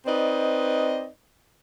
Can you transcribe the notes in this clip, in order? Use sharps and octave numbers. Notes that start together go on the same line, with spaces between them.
C4 D#4 B4 D5 D#5